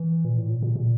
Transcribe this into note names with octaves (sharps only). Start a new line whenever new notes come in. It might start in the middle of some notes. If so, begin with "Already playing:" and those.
Already playing: E3
A#2
A2
A#2
A#2
A#2